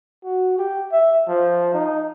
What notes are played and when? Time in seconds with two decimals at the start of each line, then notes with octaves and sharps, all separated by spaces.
0.24 F#4
0.58 G4
0.92 E5
1.28 F3
1.74 D#4